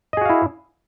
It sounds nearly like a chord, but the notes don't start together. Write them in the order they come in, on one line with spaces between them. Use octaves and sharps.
D#5 G#4 F#4 F5 E4